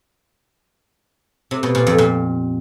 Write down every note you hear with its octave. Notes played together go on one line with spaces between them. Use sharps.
C3
B2
A#2
F2
A#2